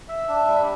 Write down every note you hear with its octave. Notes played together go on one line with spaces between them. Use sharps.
E5
D4
G3